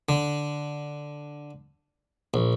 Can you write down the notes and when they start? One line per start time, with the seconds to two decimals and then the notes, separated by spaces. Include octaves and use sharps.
0.09 D3
2.34 A#1